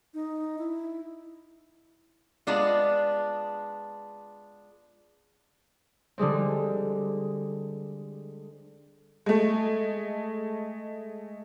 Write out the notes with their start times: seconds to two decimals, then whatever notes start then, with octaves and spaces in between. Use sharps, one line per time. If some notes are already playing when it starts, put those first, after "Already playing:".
0.14 D#4
0.58 E4
2.47 G#3 B3 D4 F4
6.18 D3 G3 G#3 C4
9.26 G#3 A3